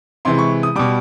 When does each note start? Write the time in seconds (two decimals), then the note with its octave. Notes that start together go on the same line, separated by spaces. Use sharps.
0.25 C3 E3 G#3 C6
0.39 C#6
0.63 D#6
0.75 B2 G3 D6